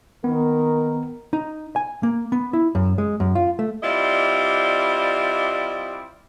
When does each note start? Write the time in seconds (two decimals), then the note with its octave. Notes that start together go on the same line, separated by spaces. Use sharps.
0.24 D#3 B3 A#4
1.33 D#4
1.76 G#5
2.03 A#3
2.32 B3
2.53 E4
2.75 F#2
2.98 G#3
3.20 F#2
3.35 F4
3.59 A3
3.83 G3 C4 E4 F4 D5 D#5